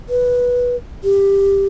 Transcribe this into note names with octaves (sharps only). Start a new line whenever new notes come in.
B4
G4